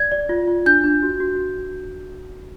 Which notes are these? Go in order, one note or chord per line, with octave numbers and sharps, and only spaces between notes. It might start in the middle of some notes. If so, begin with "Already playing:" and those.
Already playing: D5 G#6
D5
F4
F4
D4 G6
D4
F#4
F#4